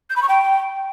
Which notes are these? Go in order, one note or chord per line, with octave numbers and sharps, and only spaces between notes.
G6
B5
C#6
G5